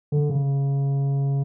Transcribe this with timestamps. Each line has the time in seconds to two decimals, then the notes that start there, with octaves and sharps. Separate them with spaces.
0.12 D3
0.29 C#3